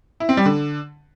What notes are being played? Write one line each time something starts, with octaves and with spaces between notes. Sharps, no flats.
E4
C4
G3
D3